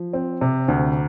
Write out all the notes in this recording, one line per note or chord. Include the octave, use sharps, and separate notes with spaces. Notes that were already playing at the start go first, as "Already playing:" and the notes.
Already playing: F3
C4
C3
D2